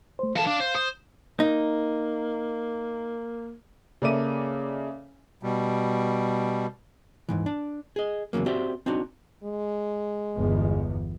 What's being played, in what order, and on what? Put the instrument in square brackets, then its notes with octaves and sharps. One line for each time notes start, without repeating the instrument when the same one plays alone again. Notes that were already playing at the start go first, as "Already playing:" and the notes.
[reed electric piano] A3 C5
[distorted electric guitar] E3 A5 [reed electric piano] A4 F5
[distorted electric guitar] D4 [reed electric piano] F5
[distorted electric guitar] C5
[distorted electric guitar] C5 [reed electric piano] D#6
[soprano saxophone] A#3 [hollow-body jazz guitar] D#4
[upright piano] C#3 A#3 A4 D5 E5 D#7
[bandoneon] B2 G3
[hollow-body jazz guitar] D#2 G#2 E3
D4
G#4 D#5
E2 A#2 C#3 F#3 A#3
C4 F#4 G4 C5 D5 E5
C4 D4 D#4 F#4
[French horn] G#3
[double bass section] G1 E2